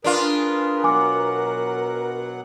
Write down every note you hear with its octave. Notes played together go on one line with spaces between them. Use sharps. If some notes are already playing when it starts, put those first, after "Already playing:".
D4 F4 G#4 A#4 B4
B2 F#3 F#5 G#5 D6